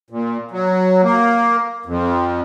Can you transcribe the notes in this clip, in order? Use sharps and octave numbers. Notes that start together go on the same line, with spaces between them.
A#2
F#3
A#3
F2